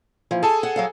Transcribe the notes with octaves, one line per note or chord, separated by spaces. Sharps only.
E3 F3 A#3
G#4 A4 G#5 A5
F#5
F#3 F5 F#5